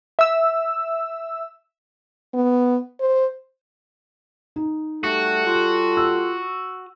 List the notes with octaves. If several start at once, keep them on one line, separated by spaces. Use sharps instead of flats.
E5 E6
B3
C5
D#4
G3 A3 F#4 G4 A4
F4
E6